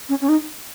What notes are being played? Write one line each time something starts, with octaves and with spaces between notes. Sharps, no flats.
C#4
C#4
D#4